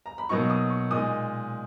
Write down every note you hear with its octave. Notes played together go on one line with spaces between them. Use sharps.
A#5
B5
B2 F#3 A#3 D#4 C#6
D#6
C#6
A#2 G#3 D#4 D#6